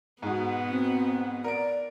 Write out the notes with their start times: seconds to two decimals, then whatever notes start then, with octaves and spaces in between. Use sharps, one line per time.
0.22 G#2 B2 B3
0.69 C4
1.44 A#4 D5 D7